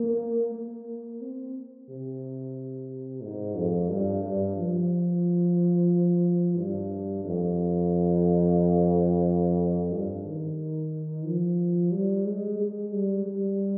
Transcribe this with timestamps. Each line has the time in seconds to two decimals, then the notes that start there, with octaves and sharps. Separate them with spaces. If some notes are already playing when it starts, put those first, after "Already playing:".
Already playing: A#3
0.55 A#3
1.21 C4
1.89 C3
3.23 G#2
3.56 F2
3.89 G2
4.23 G2
4.56 F3
6.57 G2
7.24 F2
9.92 G2
10.26 D#3
11.25 F3
11.92 G3
12.26 G#3
12.59 G#3
12.93 G3
13.26 G3